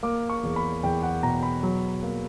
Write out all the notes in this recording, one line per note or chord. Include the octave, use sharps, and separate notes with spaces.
A#3 D6
C#6
E2
B5
E2 G5
F#5
B2 A#5
B5
F#3
A#3